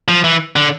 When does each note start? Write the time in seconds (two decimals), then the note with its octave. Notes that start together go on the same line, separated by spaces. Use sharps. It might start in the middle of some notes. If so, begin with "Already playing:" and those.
0.08 F3
0.24 E3
0.56 D3